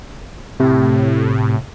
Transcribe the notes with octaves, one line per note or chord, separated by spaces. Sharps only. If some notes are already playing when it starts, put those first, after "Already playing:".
A2 C3